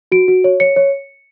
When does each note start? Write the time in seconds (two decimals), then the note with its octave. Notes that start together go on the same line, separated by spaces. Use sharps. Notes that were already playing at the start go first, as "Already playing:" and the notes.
0.12 F#4 D7
0.28 F#4
0.44 C#5
0.60 C#5 C#7
0.76 C#5